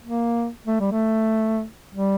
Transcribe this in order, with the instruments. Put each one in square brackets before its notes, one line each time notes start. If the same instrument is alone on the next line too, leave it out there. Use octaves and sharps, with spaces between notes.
[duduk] A#3
A3
G3
A3
G3